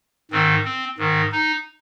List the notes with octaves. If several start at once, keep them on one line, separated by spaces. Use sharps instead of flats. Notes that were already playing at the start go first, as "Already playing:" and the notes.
G#2 D#3 C4
C4
G#2 D#3
D#4